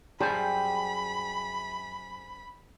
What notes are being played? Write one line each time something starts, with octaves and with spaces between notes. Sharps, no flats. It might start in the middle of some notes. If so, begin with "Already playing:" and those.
F#2 G3 G4 G#4 C5 E5 A5 B5